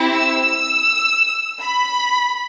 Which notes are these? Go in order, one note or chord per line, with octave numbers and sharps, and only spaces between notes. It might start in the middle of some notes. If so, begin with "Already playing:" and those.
Already playing: C4 E4 G4
E6
B5